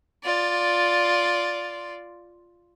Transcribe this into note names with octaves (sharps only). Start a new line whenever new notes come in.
F4 D5